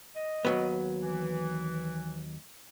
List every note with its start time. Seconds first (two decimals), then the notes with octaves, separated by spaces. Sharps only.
0.16 D#5
0.45 D#2 F#3 B3
1.03 E3